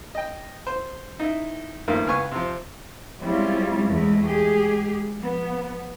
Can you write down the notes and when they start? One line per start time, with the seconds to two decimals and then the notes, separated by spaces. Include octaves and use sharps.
0.15 D#5 G5
0.67 C5
1.20 D#4 E4
1.88 G2 D#3 F3 A3 A#3
2.07 C#2 B3 G#5 C#6
2.31 C3 F3
3.23 G3 G#3 C4 C#4 E4 F4
3.89 E2 G#3 A3 E4
4.27 G#3 G4 G#4
5.19 F3 B3